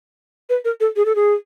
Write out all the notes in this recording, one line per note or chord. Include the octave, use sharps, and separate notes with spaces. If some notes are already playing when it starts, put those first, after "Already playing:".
B4
A#4
A4
G#4
A4
G#4